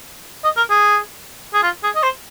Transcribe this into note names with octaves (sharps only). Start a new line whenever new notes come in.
D#5
A#4
G#4
G#4
F4
G#4
D#5
C5